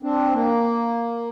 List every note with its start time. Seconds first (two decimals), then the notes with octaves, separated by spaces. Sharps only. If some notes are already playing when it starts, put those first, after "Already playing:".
0.03 C4 D4
0.34 A#3